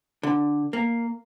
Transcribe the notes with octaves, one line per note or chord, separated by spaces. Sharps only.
D3
A#3